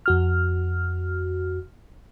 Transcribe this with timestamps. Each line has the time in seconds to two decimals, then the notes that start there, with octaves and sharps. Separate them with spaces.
0.06 F2 F#4 F6